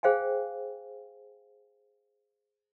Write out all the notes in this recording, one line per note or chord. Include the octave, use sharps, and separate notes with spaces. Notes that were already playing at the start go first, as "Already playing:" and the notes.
G#4 C5 F5 G5 G#5